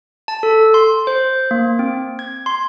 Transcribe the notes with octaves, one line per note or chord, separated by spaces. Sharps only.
A5
A4
C6
C5
A#3
C4
G#6
C6